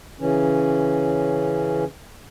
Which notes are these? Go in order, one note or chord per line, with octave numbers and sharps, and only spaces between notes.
C#3 E3 C#4